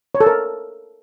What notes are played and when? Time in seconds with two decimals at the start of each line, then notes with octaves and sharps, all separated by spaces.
0.15 C#5
0.21 A4
0.26 A#4